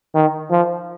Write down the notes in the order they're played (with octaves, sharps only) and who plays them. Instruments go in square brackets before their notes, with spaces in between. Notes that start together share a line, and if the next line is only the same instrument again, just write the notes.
[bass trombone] D#3
F3